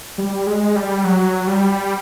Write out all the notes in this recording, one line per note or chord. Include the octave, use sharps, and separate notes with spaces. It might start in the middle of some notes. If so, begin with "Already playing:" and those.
G3
G#3
G3
F#3
G3